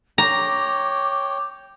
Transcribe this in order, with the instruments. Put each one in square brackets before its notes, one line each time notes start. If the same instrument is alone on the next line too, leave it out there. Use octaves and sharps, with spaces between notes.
[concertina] C#5 G5 [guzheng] A#5 [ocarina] D6